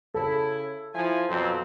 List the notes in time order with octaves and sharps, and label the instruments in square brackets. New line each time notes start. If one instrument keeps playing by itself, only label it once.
[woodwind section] C#3 E4 [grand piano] A4
[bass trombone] F3 [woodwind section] E4 G#5
[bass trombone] F2 [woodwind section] B2 F#3 C4